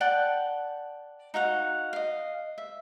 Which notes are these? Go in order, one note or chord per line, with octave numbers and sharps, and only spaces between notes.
D5 F#5 G5 A5
D#4 F#4 F5 F#5
D#5 F5
E5